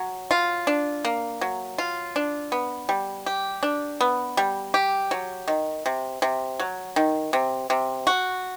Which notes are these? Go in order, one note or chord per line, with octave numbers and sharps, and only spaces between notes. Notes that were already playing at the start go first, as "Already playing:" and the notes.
Already playing: F#3
F4
D4
A#3
F#3
F4
D4
B3
G3
G4
D4
B3
G3
G4
F#3
D#3
C3
C3
F#3
D#3
C3
C3
F#4